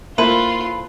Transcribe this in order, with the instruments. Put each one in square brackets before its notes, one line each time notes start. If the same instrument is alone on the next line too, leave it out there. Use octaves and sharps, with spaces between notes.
[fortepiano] A#3 [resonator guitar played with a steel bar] E4 A4 C5 [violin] F4 [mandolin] B4